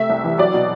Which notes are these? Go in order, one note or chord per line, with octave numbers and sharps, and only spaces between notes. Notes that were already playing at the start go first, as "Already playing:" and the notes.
Already playing: C3 A3 E5
C2
E3
F#3 D5
B2